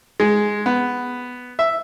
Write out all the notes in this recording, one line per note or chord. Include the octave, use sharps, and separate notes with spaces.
G#3
B3
E5